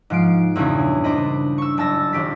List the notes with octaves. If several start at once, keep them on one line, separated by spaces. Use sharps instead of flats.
G#2 F3 C7 D7
E2 G2 A#2 C#3 C#4
D4 C5 D#5 B5
C#6 E6
F#1 A5 E6 A#6
D#1 G4 B6